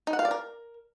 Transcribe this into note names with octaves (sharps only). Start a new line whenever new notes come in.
D#4
F#5
F5
D5
A#4